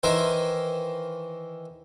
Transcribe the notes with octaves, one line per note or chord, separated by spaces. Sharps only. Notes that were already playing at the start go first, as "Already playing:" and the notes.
D#3 E3 E4 A#4 C5